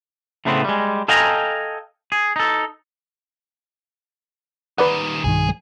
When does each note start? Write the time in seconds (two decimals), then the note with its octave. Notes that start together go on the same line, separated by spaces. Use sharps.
0.45 A2 C#3 A3 B3 C4
0.64 G3 G#3
1.08 A4 D#5 F5 G5 G#5 A#5
2.12 G#4
2.36 D#4 A4
4.78 D#3 G3 B4 D5 F#5
5.24 B1 G2 D#3 G#4